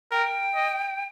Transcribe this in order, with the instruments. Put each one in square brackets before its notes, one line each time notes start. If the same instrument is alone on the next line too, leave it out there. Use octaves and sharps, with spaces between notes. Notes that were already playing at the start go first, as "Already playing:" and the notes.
[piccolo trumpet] A#4 [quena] G5
[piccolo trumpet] D#5